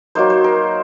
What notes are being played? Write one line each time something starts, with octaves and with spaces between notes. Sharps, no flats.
F#3 A#3 D#4 C5
C5
A#4